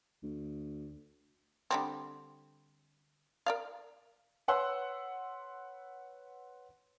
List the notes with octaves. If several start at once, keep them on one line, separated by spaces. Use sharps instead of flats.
D2
D3 G3 C4
A#4 D5 F5
B4 C#5 F#5 C6 E6